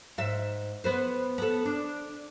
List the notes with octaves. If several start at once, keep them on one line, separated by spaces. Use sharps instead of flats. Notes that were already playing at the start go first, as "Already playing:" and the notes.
G#2 E5
B3 B4 C5
B3 A4
D4